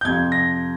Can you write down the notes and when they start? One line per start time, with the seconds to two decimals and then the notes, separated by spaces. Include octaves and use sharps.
0.01 G6
0.05 F2 C3 F3 G#6
0.32 A#6